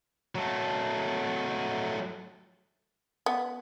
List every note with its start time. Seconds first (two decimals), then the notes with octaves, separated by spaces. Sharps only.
0.35 F#3 A3
3.26 B3